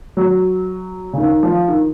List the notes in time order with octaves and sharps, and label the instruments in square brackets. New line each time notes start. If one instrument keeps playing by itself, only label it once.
[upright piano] F#3
C#3
D#3
F3
D#3